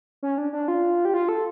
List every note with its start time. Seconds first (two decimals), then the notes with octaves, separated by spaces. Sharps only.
0.23 C#4
0.38 D4
0.53 D4
0.68 F4
1.05 G4
1.14 F4
1.29 A4